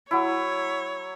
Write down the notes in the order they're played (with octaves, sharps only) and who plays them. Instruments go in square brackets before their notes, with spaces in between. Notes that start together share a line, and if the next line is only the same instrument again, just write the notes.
[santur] F#3 E4 [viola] C#5